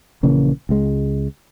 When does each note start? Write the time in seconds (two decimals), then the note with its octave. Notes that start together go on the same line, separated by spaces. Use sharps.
0.23 A#1 C#3 E3 A#3
0.69 C#2 G#3